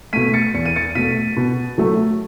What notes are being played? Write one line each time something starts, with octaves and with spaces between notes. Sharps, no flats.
B2 A3 B6 D#7
A6 C#7
E2 C#7
D#7
A6 C#7
B2 A3 B6 D#7
B2
F#3 A3